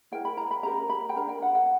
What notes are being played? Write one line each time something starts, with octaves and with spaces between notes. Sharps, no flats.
E4 A#4 G5
B5
A#5
B5
C#4 G4 A#4 A#5
B5
G5
D4 A#4 A#5
G5
F#5
F#5